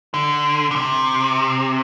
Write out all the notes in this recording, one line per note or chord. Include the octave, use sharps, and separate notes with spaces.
D3
D3
C3